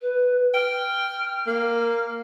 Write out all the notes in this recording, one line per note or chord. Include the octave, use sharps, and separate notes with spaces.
B4
G5 F6
A#3